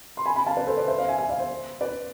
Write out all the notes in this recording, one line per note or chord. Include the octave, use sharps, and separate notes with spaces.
C6
G#5 B5
G#5 B5
F5 A5
B4 D5
A4 C5
B4 D5
C5 E5
D5 F5
E5 G#5
E5 G#5
D5 F5
C5 E5
B4 D5